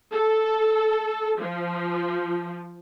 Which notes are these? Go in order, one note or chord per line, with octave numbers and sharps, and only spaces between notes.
A4
F3